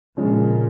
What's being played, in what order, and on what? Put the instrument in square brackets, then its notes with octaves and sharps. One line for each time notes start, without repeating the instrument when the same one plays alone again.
[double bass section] A#2 [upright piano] C#3 F3 G#3